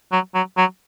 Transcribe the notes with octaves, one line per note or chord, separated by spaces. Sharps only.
F#3
F#3
F#3